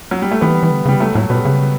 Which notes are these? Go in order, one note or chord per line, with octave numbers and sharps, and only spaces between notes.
F#3
G3
A3
E3 G3 B3
E3
D3
C#3 G3
F#3 A3
A2 F#3 A3
B2 G3 B3
C#3